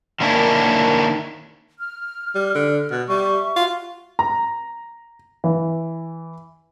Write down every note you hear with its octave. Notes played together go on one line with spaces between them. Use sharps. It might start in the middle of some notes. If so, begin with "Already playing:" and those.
D3 D#3 A#3 C#4 D4 E4
F6
G3
D3 F6
B2
G3 E5 C#6
F4 F#4
A#5
E3